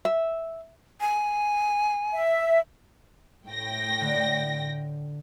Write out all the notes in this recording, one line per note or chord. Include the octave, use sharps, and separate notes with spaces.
E5
G#5
E5
A2 G5 A#6
D3